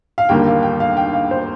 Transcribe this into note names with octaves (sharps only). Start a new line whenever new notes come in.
F5
D#2 D3 G3 A#3 G5
F5
G5
F5
G5
F5
C5